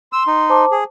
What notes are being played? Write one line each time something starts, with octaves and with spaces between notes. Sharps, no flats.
C6 E6
D#4
C5 A5 D6
G#4